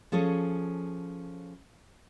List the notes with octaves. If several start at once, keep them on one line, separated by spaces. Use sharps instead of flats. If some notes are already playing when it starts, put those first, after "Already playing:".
F3 C#4 G#4 A4 C#5